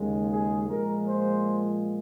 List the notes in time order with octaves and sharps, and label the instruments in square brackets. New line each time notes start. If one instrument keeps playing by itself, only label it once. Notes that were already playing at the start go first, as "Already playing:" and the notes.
Already playing: [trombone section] D#2 C#3 G#3
G#4
A#2 F3 G#3 A#4
C5